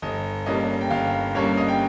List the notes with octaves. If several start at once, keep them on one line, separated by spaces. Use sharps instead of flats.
G1 D#5
G2 G3 A#3 C#4 D#5
G5
G1 F5
G2 G3 A#3 C#4 C#5
D#5
G5